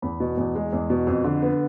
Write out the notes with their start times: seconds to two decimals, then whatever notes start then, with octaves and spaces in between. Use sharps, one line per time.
0.02 E2 B5
0.20 B2
0.37 E2
0.55 G#3
0.72 E2
0.90 B2
1.07 F2
1.24 D3
1.42 B3